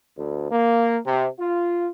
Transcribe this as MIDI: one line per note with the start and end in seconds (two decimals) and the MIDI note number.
0.17 0.50 38
0.51 0.98 58
1.05 1.27 48
1.39 1.87 65